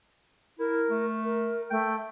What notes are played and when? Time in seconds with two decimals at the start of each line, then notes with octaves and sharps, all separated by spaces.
0.59 E4 A#4
0.90 A3
1.24 A#4
1.71 A3 G5